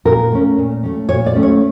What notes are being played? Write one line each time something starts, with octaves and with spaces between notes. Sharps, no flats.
A#2 A#4
A3 C#4
A#2
A3 C#4
A#2 C#5
D5
A3 C#4
C#5